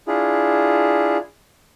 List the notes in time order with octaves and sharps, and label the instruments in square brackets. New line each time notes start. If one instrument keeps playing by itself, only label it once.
[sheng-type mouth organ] D4 E4 F4 G#4